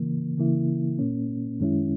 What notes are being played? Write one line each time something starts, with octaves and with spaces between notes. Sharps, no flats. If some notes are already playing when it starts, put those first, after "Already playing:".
Already playing: C#3 E3 A#3
C#3 E3 A#3 E4
A#2 A#3 C#4
F#2 D#3 G#3 C#4 E4